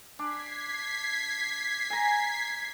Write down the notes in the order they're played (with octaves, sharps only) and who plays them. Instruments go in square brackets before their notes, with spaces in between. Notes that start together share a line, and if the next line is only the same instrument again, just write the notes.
[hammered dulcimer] D4 [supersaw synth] G#6 B6 C7
[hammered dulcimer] G#5 A#5